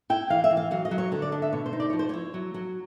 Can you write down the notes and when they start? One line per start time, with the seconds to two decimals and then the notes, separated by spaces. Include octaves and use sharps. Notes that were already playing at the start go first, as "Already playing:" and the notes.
0.10 E4 G5
0.30 E3 F5
0.44 E5
0.50 E3
0.57 F5
0.71 F#3 F5
0.85 D#5
0.91 F#3
0.98 C#5
1.12 D3 C#5
1.22 D5
1.32 D4 D#5
1.42 E5
1.53 B2 C#5
1.66 C5
1.73 D#4
1.80 D5
1.90 F3 C#5
1.99 C5
2.09 E4 C#5
2.34 F#3
2.54 F#3